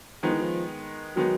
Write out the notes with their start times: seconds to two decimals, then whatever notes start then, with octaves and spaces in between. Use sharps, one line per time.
0.23 D#3 F3 G#3 B3 D#4
0.33 E3
0.41 F3
1.16 D#3 F#3 G#3 B3 D#4